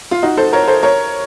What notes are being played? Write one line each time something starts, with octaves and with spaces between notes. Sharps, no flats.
F4
D#4 F#4
A4 C5
A#4 C#5
A4 C5
A#4 C#5